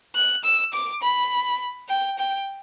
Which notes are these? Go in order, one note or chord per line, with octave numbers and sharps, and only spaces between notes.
F#6
E6
D6
B5
G5
G5